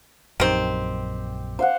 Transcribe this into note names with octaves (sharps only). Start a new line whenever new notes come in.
A#1 F#2 D#3 C4 G4
C5 F5 F#5